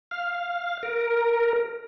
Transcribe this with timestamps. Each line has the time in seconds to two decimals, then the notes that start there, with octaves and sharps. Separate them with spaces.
0.11 F5
0.83 A#4